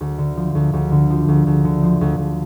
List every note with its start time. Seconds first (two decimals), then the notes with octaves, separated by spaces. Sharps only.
0.01 D2
0.18 D3
0.37 F3
0.55 D2
0.73 D2
0.92 D3
1.10 F3
1.28 D2
1.47 D2
1.65 D3
1.83 F3
2.01 D2
2.18 D2